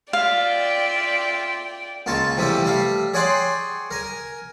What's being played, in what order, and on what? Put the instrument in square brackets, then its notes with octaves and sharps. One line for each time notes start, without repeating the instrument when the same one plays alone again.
[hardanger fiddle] F4 E5 [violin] D5 G5 [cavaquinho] F5
[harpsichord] C#2 A#3 F4 A5 C#6
C3 E3 F3 G3 A3 G4
G3 A3 F5
G#4 C#5 D5 F#5 G5 C6
A#4 G#5